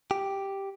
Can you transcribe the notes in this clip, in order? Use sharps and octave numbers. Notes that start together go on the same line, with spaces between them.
G4